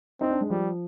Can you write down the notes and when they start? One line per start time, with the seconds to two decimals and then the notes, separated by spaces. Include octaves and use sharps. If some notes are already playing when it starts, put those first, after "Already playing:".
0.21 C4 D#4
0.30 D4
0.41 G#3
0.50 F3 G3